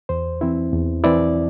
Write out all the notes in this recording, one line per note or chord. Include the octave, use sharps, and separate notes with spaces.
E2 C5
E3 C4 E4
E2
E3 C4 E4 D5